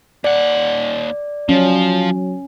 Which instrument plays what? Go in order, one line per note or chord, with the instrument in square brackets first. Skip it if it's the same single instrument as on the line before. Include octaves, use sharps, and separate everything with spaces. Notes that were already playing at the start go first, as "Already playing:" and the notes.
[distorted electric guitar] D#2 F#5 [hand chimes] D5
[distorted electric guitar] F3 [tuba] F#3 [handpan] C#4